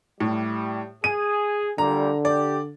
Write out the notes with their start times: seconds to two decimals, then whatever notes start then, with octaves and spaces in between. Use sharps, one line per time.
0.20 A2 G3
1.04 G#4 D#7
1.78 A#2 D3 G3 A#5
2.25 G4 D5